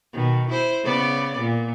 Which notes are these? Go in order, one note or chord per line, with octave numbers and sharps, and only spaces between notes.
B2 D#3
E4 C5
C#3 B3 D5
A#2